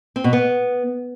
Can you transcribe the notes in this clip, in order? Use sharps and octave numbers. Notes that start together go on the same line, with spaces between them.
C4
B2
B3